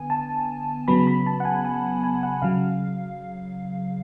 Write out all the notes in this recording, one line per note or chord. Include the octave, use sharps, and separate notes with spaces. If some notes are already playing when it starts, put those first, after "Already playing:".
Already playing: D3 B3 G#5
A5
C#3 F#3 B3 B5
B5
A5
F#5
G#5
G#5
G#5
F#5
C#3 F#3 F5